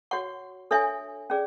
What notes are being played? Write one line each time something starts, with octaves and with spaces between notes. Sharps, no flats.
F#4 C#5 F#5 C#6
D4 A4 C#5 E5 G#5
C#4 G#4 D5